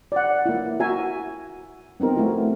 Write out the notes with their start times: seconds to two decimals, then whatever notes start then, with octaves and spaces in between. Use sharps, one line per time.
0.12 D5 F#5
0.46 A#3 E4
0.80 F#4 E5 G#5 A#5
2.00 B3 C4 D#4 A#4
2.16 A3 E4 F#4